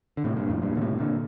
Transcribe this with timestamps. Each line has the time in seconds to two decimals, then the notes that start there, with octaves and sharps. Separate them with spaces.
0.17 D3
0.24 A2 C3
0.36 G2 A#2
0.49 F2 A2
0.62 G2 A#2
0.77 D3
0.81 A2 C3
1.00 A#2 D3